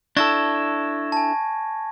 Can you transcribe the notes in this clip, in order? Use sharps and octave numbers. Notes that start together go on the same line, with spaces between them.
D4 E4 A4 C#6 G#6 A#6
G#5 A5